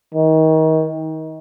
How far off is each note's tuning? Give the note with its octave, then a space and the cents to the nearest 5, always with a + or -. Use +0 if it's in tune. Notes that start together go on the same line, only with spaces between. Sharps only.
D#3 +30